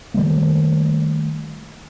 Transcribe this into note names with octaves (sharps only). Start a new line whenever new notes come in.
D#3 G3 A3 A#3